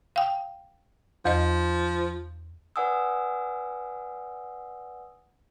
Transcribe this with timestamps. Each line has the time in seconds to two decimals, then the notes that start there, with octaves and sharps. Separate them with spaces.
0.16 F5 G5
1.25 E2 F3 D#5
2.76 B4 D5 F#5 G#5 D#6 E6